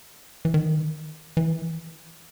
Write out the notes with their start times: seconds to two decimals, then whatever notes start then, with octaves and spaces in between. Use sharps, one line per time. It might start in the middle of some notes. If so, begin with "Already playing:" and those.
0.45 E3
0.54 D#3
1.37 E3